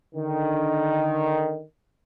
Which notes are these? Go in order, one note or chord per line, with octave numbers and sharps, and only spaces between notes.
D3 D#3